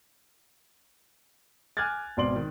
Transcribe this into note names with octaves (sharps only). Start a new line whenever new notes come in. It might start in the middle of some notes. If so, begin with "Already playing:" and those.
G#5 D6 F6 F#6 G#6 A6
G#1 B2 D5 C6 F#7
D#3